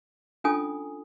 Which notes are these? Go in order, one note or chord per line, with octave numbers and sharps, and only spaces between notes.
C#4 D4 F4 A4 G#5 D#6